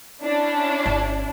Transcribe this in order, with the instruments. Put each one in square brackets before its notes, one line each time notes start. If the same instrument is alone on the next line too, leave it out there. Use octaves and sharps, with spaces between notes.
[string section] C#4 D4 E4
[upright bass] G1